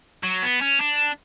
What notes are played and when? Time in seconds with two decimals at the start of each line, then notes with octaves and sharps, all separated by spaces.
0.23 F#3
0.42 B3
0.61 C#4
0.80 D4